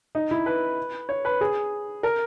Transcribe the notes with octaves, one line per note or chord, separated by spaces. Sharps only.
D#4
E4
B4
C#5
B4
G#4
A#4